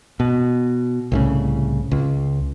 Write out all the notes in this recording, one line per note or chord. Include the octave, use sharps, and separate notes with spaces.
B2
C2 A2 C#3
C#2